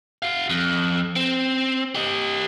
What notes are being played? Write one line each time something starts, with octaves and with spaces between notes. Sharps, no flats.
F#4 F5
F2
C4
G4 D#5